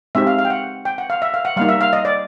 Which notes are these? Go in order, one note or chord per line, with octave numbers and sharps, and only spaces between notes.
G#3 C4 D#4 G4 E5
F5
F5
G5
F#5
G5
F#5
F5
E5
F5
F#5
G3 A#3 D#4 F5
E5
F5
D#5
D5